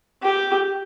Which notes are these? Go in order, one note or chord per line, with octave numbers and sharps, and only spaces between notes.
G4